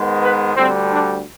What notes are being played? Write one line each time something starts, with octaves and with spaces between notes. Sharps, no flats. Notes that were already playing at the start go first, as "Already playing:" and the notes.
Already playing: G#2 D#3 G#3 B3
B4
D2 D3 G3 C4
D4